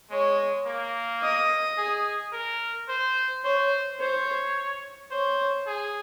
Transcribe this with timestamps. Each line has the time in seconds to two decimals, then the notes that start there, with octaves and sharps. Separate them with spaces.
0.10 G#3 C#5
0.66 A#3
1.22 D#5
1.78 G#4
2.33 A#4
2.89 C5
3.44 C5 C#5
4.00 C5 C#5
5.11 C5 C#5
5.67 G#4